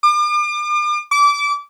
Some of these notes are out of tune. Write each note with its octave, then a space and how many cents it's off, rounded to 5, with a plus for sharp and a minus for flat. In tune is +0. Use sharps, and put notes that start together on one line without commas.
D6 +40
D6 -25